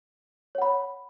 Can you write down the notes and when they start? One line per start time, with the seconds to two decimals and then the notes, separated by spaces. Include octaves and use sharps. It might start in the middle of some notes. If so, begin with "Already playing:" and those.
0.55 C#5
0.58 F#5
0.62 B5